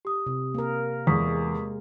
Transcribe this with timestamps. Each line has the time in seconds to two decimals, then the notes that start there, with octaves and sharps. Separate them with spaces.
0.05 G4 D#6
0.26 C3
0.54 A#3 A#4
1.07 E2 G#3 C#6 D#6 B6